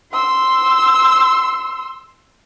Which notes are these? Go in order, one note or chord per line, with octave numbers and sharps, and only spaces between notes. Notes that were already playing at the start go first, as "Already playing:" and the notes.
C6 E6